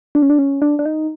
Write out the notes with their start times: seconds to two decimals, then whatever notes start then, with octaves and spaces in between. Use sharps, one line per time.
0.15 D4
0.22 C#4
0.30 D4
0.39 C#4
0.62 D4
0.79 D4
0.86 D#4